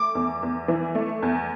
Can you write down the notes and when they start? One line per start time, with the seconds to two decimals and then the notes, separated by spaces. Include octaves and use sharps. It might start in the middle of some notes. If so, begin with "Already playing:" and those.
Already playing: A3 D6
0.15 E2
0.43 E2
0.68 E3
0.95 A3
1.22 E2